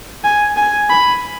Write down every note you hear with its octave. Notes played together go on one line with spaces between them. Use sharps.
G#5
G#5
B5